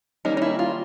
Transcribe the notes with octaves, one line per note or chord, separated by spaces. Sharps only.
D#3 G3 A#3 C#4 D#4
D#4
E4
F4